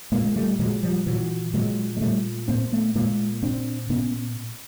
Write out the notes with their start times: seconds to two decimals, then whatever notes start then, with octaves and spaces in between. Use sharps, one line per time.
0.12 A#2 G#3 A#3
0.24 G#3
0.36 G3 A3
0.59 A#2 F#3 G#3
0.83 F3 G3
1.06 A#2 E3 F#3
1.54 A#2 F#3 G#3
1.97 G#3
2.01 A#2 G3 A3
2.48 A#2 A#3 C4
2.72 A3 B3
2.95 A#2 G#3 A#3
3.43 A#2 C4 D4
3.90 A#2 B3 C#4